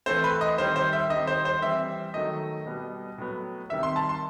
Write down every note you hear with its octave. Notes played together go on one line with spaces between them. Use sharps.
E3 A3 C4 C5
B4
D#5
D#3 G3 C4 C5
C5
E5
D#3 G3 C4 D#5
C5
C5
E3 G3 C4 E5
D#3 F#3 A3 D#5
B2 G3 B3
A2 F#3 B3
C3 D#3 G3 E5
C6
A5
C6